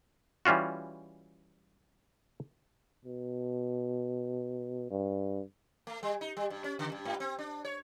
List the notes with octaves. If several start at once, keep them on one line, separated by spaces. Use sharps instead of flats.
E3 G3 C#4 F4 F#4
B2
G2
A3
G3
D#4
G3
G2
C#4
C#3
G2
G#2
C4
D4
C#5